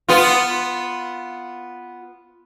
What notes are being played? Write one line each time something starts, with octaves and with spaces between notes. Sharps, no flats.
B3 F4